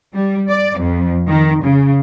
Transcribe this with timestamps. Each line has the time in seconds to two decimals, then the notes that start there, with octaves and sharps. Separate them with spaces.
0.14 G3
0.49 D5
0.78 F2
1.28 D#3
1.64 C#3